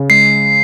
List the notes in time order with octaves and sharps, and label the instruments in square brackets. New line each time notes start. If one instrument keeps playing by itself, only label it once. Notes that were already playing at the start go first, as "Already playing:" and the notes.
Already playing: [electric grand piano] C#3
[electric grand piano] G#3 [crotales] C7